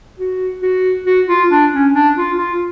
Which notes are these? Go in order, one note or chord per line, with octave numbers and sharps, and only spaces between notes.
F#4
F#4
F#4
F4
D4
C#4
D4
F4
F4